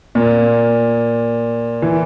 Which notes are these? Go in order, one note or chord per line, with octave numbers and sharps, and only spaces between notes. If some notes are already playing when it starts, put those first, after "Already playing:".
A#2
E3